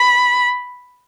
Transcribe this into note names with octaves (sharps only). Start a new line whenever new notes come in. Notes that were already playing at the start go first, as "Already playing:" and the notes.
Already playing: B5